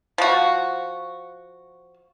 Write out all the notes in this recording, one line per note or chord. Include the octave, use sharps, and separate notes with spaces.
F3 F#4